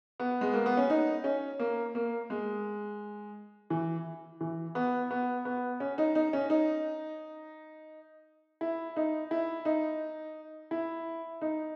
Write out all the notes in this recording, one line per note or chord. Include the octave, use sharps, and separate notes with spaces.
B3
G#3
A#3
B3
C#4
D#4
C#4
A#3
A#3
G#3
E3
E3
B3
B3
B3
C#4
D#4
D#4
C#4
D#4
E4
D#4
E4
D#4
E4
D#4